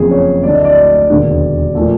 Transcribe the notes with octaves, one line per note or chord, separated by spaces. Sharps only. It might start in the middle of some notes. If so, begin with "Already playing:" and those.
Already playing: F#1 F2 C#3 G#4
C#5
D2 D3 F#3 A3 D5
D#5
D5
E1 D#2 D3
A#2 F3 A3